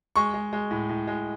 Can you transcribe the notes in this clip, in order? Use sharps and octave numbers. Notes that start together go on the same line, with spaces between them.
G#3 C#6
G#3
G#3
A2
A2
G#3